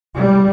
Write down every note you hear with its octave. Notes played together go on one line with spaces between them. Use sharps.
G3